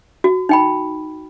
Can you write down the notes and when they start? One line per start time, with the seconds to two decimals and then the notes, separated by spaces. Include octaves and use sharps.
0.24 F#4
0.49 D#4 G5 B5